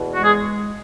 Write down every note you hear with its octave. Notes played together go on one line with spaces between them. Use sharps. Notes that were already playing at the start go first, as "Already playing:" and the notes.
Already playing: E2 B2
G#3 F#4
G#4